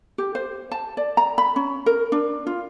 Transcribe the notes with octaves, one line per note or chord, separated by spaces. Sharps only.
G4
C5
A5
D5
A#5
B5
C#4
A#4
D4
F4